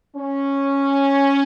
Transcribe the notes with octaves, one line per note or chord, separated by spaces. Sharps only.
C#4